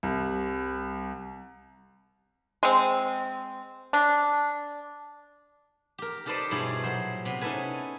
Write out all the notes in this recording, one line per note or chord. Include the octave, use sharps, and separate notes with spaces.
C2
G#3 C4
D4
G4 A#4
D#4 G4 A4 B4 C5 D5
G2 B2 E4 G#4 C#5 D5
A#2 F#3 C5
C3 B3
C#4 D#4 E4 A4 B4 G#5